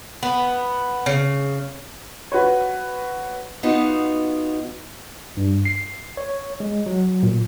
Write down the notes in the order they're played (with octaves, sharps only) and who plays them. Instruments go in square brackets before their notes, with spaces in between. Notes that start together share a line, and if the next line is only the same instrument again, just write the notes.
[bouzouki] B3
C#3
[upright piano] F#4 B4 C#5
[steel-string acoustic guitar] B3 D#4 F4 F#4
[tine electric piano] G2
C7
C#5
G#3
F#3
A#2